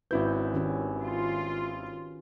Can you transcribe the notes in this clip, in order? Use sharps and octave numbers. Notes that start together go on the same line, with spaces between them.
G#1 C#4 E4 F#4 B4 G6
D#3 C#4 G4
F4